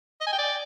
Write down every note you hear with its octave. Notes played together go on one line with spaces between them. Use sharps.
D#5
G#5
G5
D5